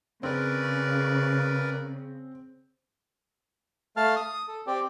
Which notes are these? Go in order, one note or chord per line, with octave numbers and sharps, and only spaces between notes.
C#3 C4 A#4 B4 D5
A3 F5 A5 F6
D#6
A4
C4 G4 D5